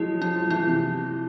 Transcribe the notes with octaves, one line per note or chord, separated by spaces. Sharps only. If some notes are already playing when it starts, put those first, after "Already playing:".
Already playing: F3 F#3 G#3 E4
F3 E4
F3
E3 E4
C3